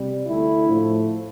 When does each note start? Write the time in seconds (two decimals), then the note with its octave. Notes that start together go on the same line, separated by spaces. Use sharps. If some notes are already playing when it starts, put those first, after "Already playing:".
Already playing: C3 G3
0.27 D2 D3 A3 E4
0.66 A2 F3 A3